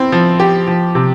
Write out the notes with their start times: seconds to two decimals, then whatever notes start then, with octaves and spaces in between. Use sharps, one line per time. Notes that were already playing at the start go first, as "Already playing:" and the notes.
Already playing: C4 E4
0.12 F3
0.40 G4
0.67 F3
0.95 C3